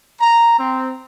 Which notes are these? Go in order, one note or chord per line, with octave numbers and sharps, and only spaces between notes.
A#5
C4